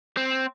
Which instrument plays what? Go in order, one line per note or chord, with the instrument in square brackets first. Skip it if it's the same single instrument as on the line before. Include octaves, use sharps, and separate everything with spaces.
[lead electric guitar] C4